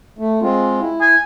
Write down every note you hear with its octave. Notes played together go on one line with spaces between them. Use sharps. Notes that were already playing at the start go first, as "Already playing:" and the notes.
A3
G#3 C4 F4
E4
G#5